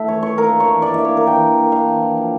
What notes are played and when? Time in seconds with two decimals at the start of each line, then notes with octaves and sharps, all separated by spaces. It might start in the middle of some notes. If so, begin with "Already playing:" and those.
Already playing: A3 E4 E5
0.08 E3 C#5
0.22 E3 C#5
0.37 A#3 A#4
0.52 D4
0.60 C#5
0.68 E3
0.82 E3 D5
0.94 A#3 E5
1.05 C#5
1.12 D4 A#4
1.27 E3 G5
1.43 E3
1.58 A#3
1.72 D4 F5
1.88 E3
2.02 E3
2.17 F3